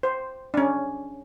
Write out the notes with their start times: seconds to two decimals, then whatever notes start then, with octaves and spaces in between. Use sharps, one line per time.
0.03 C5
0.54 C#4 D4